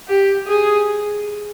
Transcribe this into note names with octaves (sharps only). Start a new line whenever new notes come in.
G4
G#4